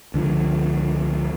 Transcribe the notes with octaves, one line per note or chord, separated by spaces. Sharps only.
C#2 D3 F3